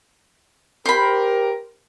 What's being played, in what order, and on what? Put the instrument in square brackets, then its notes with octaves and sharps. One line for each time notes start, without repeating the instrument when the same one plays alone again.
[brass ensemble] G4 A#4 [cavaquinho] C5 B5